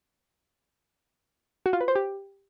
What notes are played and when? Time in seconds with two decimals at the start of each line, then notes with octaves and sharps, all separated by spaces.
1.66 F#4
1.73 F4
1.81 B4
1.88 C5
1.95 G4